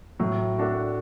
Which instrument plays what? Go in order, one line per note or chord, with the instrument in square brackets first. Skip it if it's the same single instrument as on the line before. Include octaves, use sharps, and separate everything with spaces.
[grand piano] A2 [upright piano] F#3
[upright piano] A3 D4 F#4